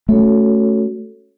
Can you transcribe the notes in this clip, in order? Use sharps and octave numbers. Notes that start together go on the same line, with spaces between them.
A3 C#4 F#4 A4 C#5